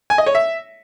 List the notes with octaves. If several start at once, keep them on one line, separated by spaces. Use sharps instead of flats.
G#5
D#5
C#5
E5